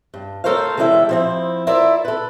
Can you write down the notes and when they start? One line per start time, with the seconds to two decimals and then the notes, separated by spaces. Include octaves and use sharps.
0.14 G2
0.44 A3 A4 A#4 C5 C#5 F5
0.77 E3 G3 G#3 E4 A4 E5
1.09 F3 C4 E4
1.67 E4 F4 A#4 D5 E5
2.05 A4 B4